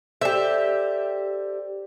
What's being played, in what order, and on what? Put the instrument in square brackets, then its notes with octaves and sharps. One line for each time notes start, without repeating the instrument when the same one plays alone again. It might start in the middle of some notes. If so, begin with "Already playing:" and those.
[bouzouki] G4 E5 [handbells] A4 C5 D5